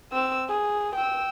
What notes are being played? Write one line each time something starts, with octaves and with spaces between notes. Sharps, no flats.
C4 E6
G#4
G5 E6